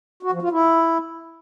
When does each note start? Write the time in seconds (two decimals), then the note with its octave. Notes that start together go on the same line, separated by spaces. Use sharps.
0.23 F#4
0.32 F3
0.42 F4
0.52 E4